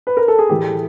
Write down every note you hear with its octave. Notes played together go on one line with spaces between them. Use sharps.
B4
A#4
A4
G#4
A2 E3 A3 G4